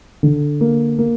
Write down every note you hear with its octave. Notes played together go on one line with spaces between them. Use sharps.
D3
A#3
A#3